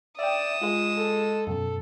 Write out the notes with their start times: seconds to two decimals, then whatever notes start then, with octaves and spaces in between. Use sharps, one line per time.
0.19 D5 E5 G5 D#6 E7
0.61 G#3 F4 G#4
0.97 A4
1.47 F#2 B2 A4